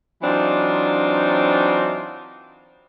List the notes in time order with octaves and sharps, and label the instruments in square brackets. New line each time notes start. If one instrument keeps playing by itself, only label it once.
[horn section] E3 F#3 C4 D4 D#4 F4